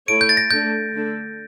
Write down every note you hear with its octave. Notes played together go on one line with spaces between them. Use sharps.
A3 E4 A4 C#5 D7
G6
A6
A#6
A3 D4 A4 G6
D3 A3 D4 A4